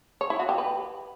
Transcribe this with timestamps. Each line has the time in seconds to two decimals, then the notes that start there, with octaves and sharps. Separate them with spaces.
0.21 C#5
0.30 E4
0.39 F#4
0.49 G4
0.58 B4